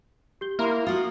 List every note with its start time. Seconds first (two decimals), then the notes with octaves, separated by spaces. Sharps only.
0.41 G4 G6 G7
0.59 A#3 E4 A#4 E5 A#5 C6
0.87 F4 F#4 D#6